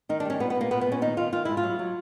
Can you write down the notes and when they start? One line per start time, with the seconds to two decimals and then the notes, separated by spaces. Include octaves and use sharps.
0.09 D#3 D#4
0.20 D4
0.25 G3 C#4
0.40 A#2 B3
0.50 B3
0.55 A#2
0.61 A#3
0.71 A#2 B3
0.81 B3
0.86 A#2
0.92 C#4
1.02 D#3 D#4
1.17 D#3 F4
1.32 D#3 F4
1.45 G#2 E4
1.57 F4
1.63 F#3
1.79 F#3